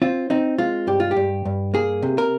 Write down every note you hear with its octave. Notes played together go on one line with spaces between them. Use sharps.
C4 F4
C4 D#4
G#3 F4
G2 G4
F4
G4
G2
G2
A#3 G#4
C3
A#4